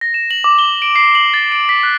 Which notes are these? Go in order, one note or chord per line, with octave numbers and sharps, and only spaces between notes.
A#6
E7
F#7
D6
G7
D7
C7
F#7
A6
D7
B6
F#6